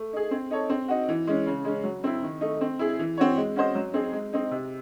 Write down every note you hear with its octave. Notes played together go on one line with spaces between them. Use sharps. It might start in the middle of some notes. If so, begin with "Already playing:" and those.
Already playing: A3
D#4 G#4
C4
D#4 A4 C#5
C4
D#4 F#4
E3
G#3 C#4
C#3
G#3 C#4
F#3
C4 E4
D#3
A3 D#4
C4
E4 G#4
E3
C4 F#4 C#5
G#3
C#4 F#4 C5 D#5
F#3
C4 D#4 G#4
G#3
C4 D#4
C3